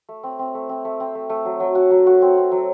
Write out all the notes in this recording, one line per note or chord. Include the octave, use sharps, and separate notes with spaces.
A3
C4
C4
A3
C4
A3
C4
A3
A3
F#3
F#3
F#4
F#3
F#4
C4
C4
F#3